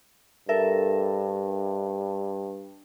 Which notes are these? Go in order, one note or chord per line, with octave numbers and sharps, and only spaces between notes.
G2 A4 A#4 E5